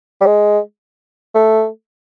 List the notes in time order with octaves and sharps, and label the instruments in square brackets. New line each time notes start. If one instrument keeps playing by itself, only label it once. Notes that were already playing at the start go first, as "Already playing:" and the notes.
[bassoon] G3
G#3
A3